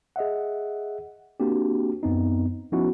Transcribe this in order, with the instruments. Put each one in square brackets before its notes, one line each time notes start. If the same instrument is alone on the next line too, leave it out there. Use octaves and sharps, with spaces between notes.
[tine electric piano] G#4 D#5 E5 F#5
A#3 C4 D4 F#4 G4
F#2 B3 C4 D#4
F3 B3 C#4 D#4 E4 F#4